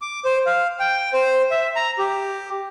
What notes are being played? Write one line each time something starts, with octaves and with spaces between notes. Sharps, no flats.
D6
C5
F5
G5
C5
E5
A#5
G4